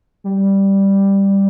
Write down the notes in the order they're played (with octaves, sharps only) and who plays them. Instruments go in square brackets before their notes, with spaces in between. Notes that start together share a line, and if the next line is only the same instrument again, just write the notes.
[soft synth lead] G3